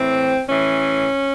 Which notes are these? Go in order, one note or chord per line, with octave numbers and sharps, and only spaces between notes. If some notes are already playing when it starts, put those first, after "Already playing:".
Already playing: A2 E3 C4
A2 E3 C#4